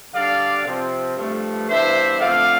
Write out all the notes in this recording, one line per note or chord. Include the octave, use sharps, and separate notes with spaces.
D3 G3 D4 D5 F5
C3 F3 C4
G2 F3 A3
G2 E3 B3 D4 C5 E5
D3 F3 A3 C4 D5 F5